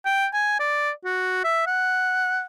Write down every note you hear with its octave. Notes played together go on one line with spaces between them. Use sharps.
G5
G#5
D5
F#4
E5
F#5